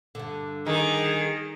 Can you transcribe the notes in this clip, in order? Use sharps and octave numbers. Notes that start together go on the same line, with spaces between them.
G2 D3
D#3 G#4